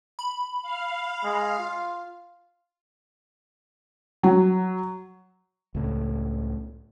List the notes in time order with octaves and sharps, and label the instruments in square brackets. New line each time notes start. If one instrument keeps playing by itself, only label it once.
[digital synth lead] B5
[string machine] F5
[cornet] G#3
F4
[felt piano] F#3
[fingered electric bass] C#2 A2